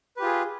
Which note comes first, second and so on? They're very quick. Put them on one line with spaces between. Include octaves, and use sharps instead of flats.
B4 G4 F4 G#4